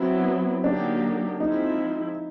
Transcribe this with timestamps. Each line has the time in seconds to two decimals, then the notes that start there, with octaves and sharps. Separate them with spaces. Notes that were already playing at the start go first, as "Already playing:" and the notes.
Already playing: F#3 B3 C4 E4
0.64 D3 F#3 A#3 D4 D#4 G4
1.40 F3 G#3 C4 D#4 E4